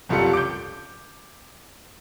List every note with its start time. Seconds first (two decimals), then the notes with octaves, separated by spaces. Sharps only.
0.09 F#1 C2 G3 F4 A4 C#7
0.34 D6 G6